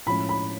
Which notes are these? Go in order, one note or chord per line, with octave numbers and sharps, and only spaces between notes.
A2 F3 G#3 C#4 B5
B5